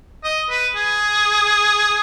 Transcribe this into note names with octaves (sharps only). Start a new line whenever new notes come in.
D#5
B4
G#4